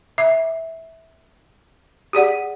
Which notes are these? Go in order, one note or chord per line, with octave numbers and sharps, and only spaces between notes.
E5
G4 G#4 D5 F#5